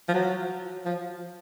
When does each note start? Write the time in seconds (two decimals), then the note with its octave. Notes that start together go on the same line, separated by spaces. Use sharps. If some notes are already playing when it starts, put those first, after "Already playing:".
0.08 F3
0.14 F#3
0.85 F3